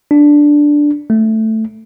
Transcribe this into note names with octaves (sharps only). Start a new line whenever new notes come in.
D4
A3